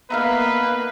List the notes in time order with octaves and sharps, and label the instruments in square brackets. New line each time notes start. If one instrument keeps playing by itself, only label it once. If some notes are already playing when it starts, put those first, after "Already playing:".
[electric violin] A#3 B3 [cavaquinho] D#4 E5 F5 [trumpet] B4